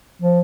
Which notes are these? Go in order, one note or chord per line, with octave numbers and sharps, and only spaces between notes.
F3